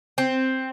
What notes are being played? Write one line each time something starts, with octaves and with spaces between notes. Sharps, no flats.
C4